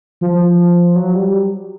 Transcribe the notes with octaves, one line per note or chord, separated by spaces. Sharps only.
F3
F#3
G3